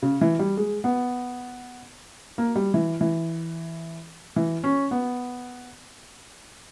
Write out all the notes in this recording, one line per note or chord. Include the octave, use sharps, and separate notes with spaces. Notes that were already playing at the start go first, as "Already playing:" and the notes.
C#3
E3
G3
G#3
B3
A#3
G3
E3
E3
E3
C#4
B3